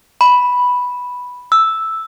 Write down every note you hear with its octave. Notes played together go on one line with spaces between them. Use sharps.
B5
E6